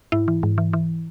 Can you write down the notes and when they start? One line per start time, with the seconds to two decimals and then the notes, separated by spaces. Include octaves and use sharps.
0.12 G#2 E4
0.28 E3
0.43 G#2
0.58 E3
0.73 E3